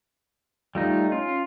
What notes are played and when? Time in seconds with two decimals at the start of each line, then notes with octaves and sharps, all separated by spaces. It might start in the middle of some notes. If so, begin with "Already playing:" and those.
0.75 G3 A3 D#4 F4
1.12 C#4 F4